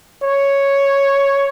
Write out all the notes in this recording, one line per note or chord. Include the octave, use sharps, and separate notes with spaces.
C#5